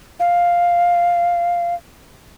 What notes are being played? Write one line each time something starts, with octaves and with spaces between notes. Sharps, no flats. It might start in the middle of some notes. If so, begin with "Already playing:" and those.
F5